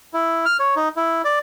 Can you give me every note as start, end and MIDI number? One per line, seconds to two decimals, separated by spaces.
0.14 0.45 64
0.46 0.57 89
0.60 0.75 73
0.76 0.89 63
0.96 1.22 64
1.24 1.39 74